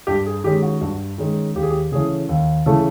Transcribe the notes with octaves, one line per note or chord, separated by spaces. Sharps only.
G2 G4
G#4
D#3 G#3 C#4 G4
F#4
G2
D#3 G#3 C#4
D#2 G4
G#4
G4
C#3 E3 A3 C#4 G#4
D#2
C#3 E3 A3 C#4 A4